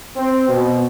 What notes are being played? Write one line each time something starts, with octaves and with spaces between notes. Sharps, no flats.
C4
B2